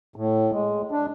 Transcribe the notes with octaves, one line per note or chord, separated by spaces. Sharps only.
A2
G#3
D4